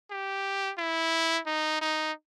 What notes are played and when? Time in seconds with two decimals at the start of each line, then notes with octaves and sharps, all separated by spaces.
0.10 G4
0.78 E4
1.46 D#4
1.81 D#4